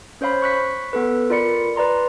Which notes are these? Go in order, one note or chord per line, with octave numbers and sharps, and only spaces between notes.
C#4 C5 C#5 F5 B5
C#6 F#6 B6
B3 A4 B4
F4 A#4 D5 B5 C#7
B4 D5 A#5 C6